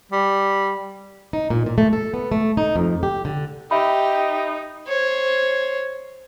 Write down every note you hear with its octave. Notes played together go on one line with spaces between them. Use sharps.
G3
D#4
A#2
A#2
A3
A4
B3
A3
D#4
F2
G4
D3
D#4 G4 E5 G5 B5
C5 C#5